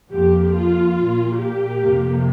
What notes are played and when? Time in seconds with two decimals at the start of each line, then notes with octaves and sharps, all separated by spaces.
0.11 F2 F3 A#3 G4
0.54 F4
0.96 A#2 A#3
1.38 G4
1.80 F2 C3 A#3